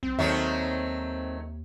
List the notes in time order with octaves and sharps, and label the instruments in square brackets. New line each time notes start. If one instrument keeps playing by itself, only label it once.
[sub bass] B1 [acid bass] C4
[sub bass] D#2 [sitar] D#3 F#3 A3 [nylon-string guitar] E5